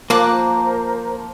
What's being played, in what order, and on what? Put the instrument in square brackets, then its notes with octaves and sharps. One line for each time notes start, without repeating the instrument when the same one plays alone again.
[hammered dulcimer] F3 [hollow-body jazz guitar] A#3 [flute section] A#4 C5 A#5 [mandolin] D6 F#6